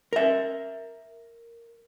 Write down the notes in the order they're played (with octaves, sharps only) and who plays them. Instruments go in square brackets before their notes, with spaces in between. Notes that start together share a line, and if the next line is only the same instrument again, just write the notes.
[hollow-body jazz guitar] A#4 E5